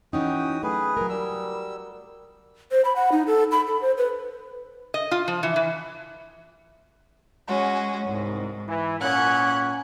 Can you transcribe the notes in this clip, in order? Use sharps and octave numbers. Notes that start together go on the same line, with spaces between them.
E3 C#4 D#4 F#4 G5 D#6
F#3 A3 G#4 B4
F#3 A#4
G3 E6
C5
B5
F#5
D#4
A4
B5
A4
C5
B4
D#5
F4
F3
E3
E3
G#3 C#4 F#4
C2 G#2
E3 E4
A#2 C#4 F#5 F#6 G#6